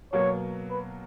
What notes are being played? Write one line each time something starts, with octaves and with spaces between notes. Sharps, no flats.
B2 F#3 A#3 C#5
B4